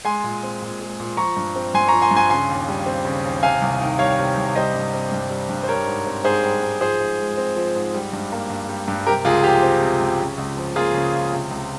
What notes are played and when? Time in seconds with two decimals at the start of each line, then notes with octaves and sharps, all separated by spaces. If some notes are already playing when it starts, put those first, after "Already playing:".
0.05 G#3 G#5 C6
0.24 A#2
0.43 C4
0.62 A#2
0.81 G#3
1.00 A#2
1.17 F3 A#5 C#6
1.37 G2
1.56 C4
1.74 G2 G#5 C6
1.88 A#5 C#6
1.92 F3
2.02 G#5 C6
2.11 G2
2.17 G#5 C6
2.30 C#3 G#5 C6
2.49 D#2
2.68 G3
2.86 C4
3.05 C#3
3.24 D#2
3.43 C3 F5 G#5
3.62 C2
3.81 D#3
3.99 G3 C#5 F5
4.19 C3
4.37 C2
4.55 G3 C5 D#5
4.74 G2
4.94 C4
5.12 G2
5.30 G3
5.49 G2
5.63 C5
5.68 G3 A#4 C#5
5.87 G#2
6.06 C4
6.24 G#2 G#4 C5
6.43 G3
6.63 G#2
6.81 F3 G#4 C5
7.00 G#2
7.19 G#3
7.37 C4
7.56 F3
7.75 G#2
7.94 G3
8.13 G2
8.32 A#3
8.50 G2
8.69 G3
8.88 G2
9.07 C3 G4 A#4
9.25 C#2 F4 G#4
9.43 F3 G4
9.63 C4
9.82 C3
10.00 C#2
10.20 C#3
10.38 C#2
10.57 F3
10.76 A#3 F4 G#4
10.94 C#3
11.13 C#2
11.32 C3
11.51 C#2